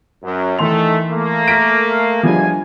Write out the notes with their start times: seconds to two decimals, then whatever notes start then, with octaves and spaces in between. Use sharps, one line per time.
0.23 F#2
0.58 D#3 E3 A3 C6 F7
1.10 A3 A#3
1.48 F6 B6 D7
2.23 E2 F3 G3 G#3 D4 G#5